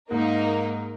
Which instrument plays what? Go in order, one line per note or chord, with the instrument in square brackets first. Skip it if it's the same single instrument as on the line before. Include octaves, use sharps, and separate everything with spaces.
[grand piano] G#2 [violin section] A#3 D#4 A#4